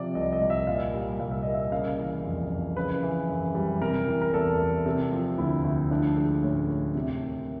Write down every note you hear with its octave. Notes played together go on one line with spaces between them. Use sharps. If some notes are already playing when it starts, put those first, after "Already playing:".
Already playing: C3 F3 D5
C2 D#5
D#5
C2
E5
A#2 F5
G3
C2 F5
E5
A#3 D#5
E5
C#3 F5
E3
F2
F2
C#3 B4
E3
F#2
G3
C3 A#4
E3
A#4
E2 A4
A3
C3
F3
D2 E4
D2
F3 D4
G#3
A2 C#4
A2
C3
D#3